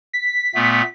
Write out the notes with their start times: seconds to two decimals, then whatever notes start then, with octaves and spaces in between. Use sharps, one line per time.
0.13 B6
0.55 A#2 A3 B3